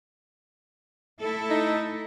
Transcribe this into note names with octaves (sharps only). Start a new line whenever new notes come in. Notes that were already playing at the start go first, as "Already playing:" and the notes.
A3 E4 A4
D#4